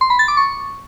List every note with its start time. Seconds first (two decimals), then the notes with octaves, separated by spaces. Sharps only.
0.01 C6
0.10 B5
0.19 A6
0.28 D6
0.37 C#6